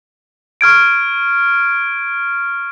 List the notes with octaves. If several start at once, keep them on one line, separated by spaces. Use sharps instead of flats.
C#6 F6 G#6 D7